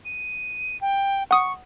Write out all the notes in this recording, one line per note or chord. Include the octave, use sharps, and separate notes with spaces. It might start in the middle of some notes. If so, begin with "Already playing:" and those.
D#7
G5
F#5 C#6 D#6